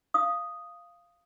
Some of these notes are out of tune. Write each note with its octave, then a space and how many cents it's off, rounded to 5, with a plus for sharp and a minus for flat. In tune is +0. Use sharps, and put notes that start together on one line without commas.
F5 -10 D#6 +0